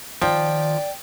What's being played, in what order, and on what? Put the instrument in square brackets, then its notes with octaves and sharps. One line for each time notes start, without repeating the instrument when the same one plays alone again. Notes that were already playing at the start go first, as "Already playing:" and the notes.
[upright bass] D#3 [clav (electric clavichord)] F3 [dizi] D5 [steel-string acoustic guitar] G5